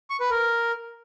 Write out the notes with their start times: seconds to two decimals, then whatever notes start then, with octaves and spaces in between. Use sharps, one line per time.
0.10 C#6
0.20 B4
0.31 A#4